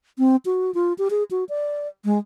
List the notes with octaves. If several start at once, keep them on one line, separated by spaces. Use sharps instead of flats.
C4
F#4
F4
G4
G#4
F#4
D5
G#3